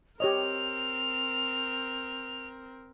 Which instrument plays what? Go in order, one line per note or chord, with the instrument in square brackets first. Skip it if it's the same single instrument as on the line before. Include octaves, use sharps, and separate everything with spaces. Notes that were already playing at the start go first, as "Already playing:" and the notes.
[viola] C4 A#4 [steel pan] G4 C#5 D#5 [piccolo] F7